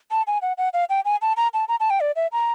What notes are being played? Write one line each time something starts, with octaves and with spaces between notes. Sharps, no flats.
A5
G#5
F#5
F#5
F5
G5
G#5
A5
A#5
A5
A#5
A5
G5
D5
E5
A#5